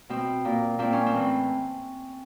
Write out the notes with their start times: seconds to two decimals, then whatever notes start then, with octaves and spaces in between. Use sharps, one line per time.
0.09 B2 C4
0.45 A#2
0.79 A#2 C4
0.93 C#4
1.06 C4
1.14 A2 E3